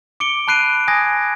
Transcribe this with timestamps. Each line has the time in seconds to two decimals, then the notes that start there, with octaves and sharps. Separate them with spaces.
0.20 D6 C#7 D7 G7
0.48 A5 B5 F#6 C7 D7 D#7
0.88 G#5 D#6 G#6 A#6